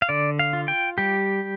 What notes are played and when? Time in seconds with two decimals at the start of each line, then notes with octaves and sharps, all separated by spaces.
0.02 F5
0.09 D3 D5
0.39 F5
0.53 F4
0.68 G5
0.98 G3 G4